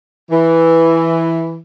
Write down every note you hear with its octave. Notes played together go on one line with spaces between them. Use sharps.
E3